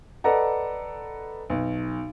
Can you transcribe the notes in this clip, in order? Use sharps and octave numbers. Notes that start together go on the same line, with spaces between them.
A4 B4 D5 D#5 F#5 A#5
B1